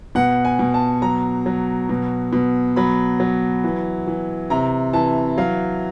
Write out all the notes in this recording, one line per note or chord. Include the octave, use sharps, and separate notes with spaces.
B2 F#5
G#5
B2
A5
F#3 A#5
F#3
B2
B2
F#3 B5
F#3
E3
E3
C3 A#5
E3 A5
F#3 F5